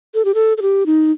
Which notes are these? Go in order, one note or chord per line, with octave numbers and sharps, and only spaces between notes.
A4
G4
A4
A4
G4
D#4